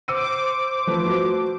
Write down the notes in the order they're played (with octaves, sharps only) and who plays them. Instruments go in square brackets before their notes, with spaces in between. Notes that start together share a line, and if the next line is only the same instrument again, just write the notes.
[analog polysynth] C5 D6 [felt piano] E6 C#7 D#7
[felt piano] F3 A3 B4
A3 F#4